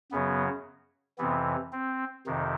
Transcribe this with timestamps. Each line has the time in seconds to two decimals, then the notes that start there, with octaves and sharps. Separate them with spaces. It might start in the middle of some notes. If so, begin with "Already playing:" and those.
0.12 F#2 C#3 F#3 B3
1.18 F2 C3 E3 B3
1.72 C4
2.26 F2 C3 D#3